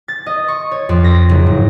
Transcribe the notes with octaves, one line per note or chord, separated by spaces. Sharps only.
A6
D#5
C#6
C#5
F2
A#6
F#1
G#2